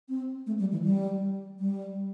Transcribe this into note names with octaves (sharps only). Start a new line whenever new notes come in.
C4
A3
G3
E3
G3
G3